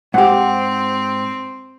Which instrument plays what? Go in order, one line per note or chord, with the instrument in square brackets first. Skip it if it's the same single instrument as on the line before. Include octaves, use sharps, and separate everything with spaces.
[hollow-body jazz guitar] G#2 G4 [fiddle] C4 [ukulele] F#5